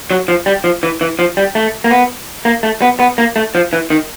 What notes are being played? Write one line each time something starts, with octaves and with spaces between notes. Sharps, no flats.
F#3
F3
G3
F3
E3
E3
F3
G3
A3
A#3
B3
A#3
A3
B3
B3
A#3
A3
F3
E3
D#3